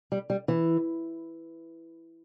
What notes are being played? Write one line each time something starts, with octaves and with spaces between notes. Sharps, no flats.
G3
G3
E3